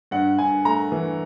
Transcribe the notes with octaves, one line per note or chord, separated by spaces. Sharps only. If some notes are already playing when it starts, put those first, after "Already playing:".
G2 F#5
G2 G#5
A3 A#5
E3